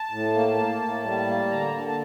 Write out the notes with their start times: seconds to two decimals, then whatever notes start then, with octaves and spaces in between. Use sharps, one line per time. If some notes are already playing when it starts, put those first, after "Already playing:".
Already playing: A5
0.11 A2
0.34 A#3
0.57 A#3
0.81 A2
1.04 G3
1.27 A#3
1.50 D3 A#5
1.74 D3 A5
1.87 A5